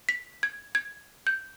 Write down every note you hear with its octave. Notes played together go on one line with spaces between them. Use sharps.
B6
G#6
G#6
G6